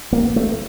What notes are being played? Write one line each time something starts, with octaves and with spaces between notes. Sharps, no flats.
A#3
A3